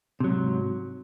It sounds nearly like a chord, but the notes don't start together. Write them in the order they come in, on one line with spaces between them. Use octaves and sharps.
C3 F#3 G#2